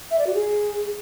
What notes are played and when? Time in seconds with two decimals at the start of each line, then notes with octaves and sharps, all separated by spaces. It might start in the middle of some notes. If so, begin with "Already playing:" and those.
0.11 E5
0.19 D5
0.27 F#4
0.35 G#4